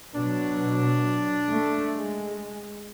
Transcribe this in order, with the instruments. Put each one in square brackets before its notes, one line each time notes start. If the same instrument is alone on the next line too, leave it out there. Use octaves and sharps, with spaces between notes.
[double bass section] B2 F#3 [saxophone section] D4
[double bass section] A3
G#3